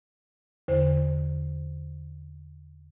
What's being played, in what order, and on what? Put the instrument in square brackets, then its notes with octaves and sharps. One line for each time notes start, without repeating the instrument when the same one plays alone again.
[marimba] E2 D3 C5